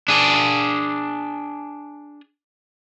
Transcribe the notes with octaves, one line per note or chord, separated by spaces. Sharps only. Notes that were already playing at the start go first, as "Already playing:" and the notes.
D4 G#4